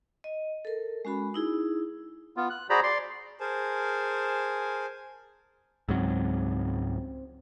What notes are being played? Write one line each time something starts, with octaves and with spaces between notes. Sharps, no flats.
D#5
A4 A#4
G#3 C#4 F#4 B5
D#4 E4 G#4
B3 F4
F#6
F#4 G#4 C5 D5 A#5 B5
D5 C6
G#4 A#4 C5 G#5 A5
C#2 G#2 F#3 C4